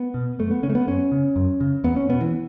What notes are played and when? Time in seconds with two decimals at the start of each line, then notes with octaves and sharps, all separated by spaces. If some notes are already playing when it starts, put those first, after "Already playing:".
Already playing: B3
0.14 B2
0.39 F#2 A3
0.51 B3
0.63 C#3 C#4
0.70 A3
0.75 B3
0.87 F#2 C#4
1.12 C#3
1.36 F#2
1.61 C#3
1.84 E2 B3
1.96 C#4
2.09 B2 B3
2.21 E3